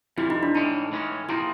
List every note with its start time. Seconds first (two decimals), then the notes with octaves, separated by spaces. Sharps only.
0.18 F2 C3 E3 G3 E4
0.30 D#4
0.43 D4
0.55 A2 E3 G#3 C#4 D#4
0.92 A2 E3 G#3 C#4
1.29 C3 F3 A#3 D#4 E4